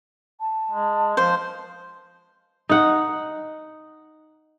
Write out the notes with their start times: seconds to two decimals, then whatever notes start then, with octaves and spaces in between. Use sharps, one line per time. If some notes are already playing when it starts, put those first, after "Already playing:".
0.40 A5
0.71 G#3
1.17 F3 C5
2.69 D#4 F#5